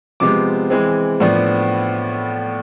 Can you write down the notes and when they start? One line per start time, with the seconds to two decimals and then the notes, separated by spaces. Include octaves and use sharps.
0.20 C3 F3 G#3 B3 D6
0.70 E3 G#3 C4
1.20 A2 F3 B3 D4